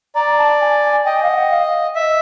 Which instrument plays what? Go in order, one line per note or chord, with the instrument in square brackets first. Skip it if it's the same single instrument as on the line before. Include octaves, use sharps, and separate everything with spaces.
[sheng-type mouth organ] D5 [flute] A#5
[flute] A5
G#5
[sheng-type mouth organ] D#5 [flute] G5
[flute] F5
F#5
F5
[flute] D#5 [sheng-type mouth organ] E5